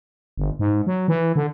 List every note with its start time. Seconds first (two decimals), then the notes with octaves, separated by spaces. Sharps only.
0.37 G1
0.59 G#2
0.87 F#3
1.08 E3
1.36 D3